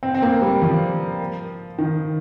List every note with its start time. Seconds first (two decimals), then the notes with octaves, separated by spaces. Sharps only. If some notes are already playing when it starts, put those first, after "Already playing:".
0.03 C4
0.15 C4
0.22 A#3
0.42 G3
0.62 F3
1.79 D#3